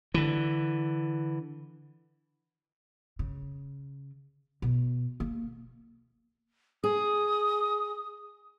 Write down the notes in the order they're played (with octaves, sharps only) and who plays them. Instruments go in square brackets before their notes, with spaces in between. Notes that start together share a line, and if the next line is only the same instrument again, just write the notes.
[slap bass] D3 E3
[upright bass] C#3
B2
A#3
[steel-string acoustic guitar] G#4 [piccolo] D#6